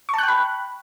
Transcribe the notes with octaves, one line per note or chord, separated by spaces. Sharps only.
G5 A5 B5 C#6 F#6